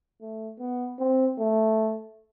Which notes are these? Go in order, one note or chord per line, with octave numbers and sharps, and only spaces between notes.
A3
B3
C4
A3